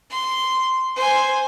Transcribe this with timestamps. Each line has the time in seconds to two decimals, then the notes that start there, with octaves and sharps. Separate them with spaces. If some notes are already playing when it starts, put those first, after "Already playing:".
0.10 C6
0.96 C5 G#5